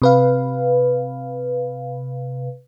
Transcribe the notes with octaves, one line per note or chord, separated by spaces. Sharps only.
C3 B4 F5